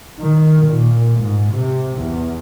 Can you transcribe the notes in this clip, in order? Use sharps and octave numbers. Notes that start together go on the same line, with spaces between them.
D#3
A#2
G#2
C3
E2